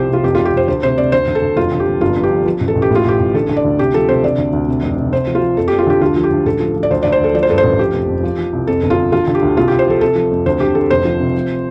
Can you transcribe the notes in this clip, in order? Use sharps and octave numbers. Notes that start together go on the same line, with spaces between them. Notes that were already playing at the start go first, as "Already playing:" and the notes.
Already playing: C2 F3 G4 C5
C3 F4
F1 G4
F1 F4
G4
F1 C5
D2 C5
C3 C5
C3 D5
D2 C5
D2
A4
D2
F1 F4
D3
G4
F1
G1 F4
G2
G4
F3
F3
A1
A4
A1
G4
A2 F4
A1 G4
A1
D3 A4
D3
D5
D2
C3 G4
F3 A4
C3 C5
D3 D5
D2
D2
C3
F1
C3
C3 C5
F3
F4
F3
F2 A4
F2 G4
F4
D3 G4
D2 F4
F3
G4
D2
A1 A4
F3
F3
D5
D2 C5
D2 D5
C5
D2 A4
F3 D5
C5
G2 A4
C5
A1
F3 G4
F1
F2
F3
F3
C2
F2 A4
G1
F4
G1
D3 F4
D3
G4
D2
C2 F4
C2 G4
C5
F3 A4
C3 A4
F3
F2
D2 C5
D3 G4
D2 A4
F1 C5
F3
C3
F3